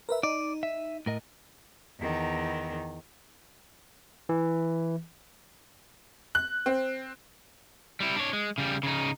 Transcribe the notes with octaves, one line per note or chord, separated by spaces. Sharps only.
A#4 B4 E5
D#4 D5
E5
A2 A#4 D#5
E2 D#3
E3
F#6
C4
G3 E4
D4 C#5
G#3
C#3 G3
C#3 D#4